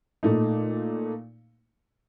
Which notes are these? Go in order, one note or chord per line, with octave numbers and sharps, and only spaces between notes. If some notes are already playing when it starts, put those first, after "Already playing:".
A#2 A3 D#4